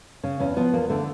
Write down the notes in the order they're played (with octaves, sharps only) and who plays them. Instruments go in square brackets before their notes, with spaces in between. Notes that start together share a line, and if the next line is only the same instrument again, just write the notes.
[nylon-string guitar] C#3 C#4
E2 C#4
F3 B3
E2 A#3
D3 A3